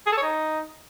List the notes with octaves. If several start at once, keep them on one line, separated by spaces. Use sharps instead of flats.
G#4
A4
C#5
D#4